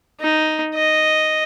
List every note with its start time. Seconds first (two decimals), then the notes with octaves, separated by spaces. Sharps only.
0.21 D#4
0.75 D#5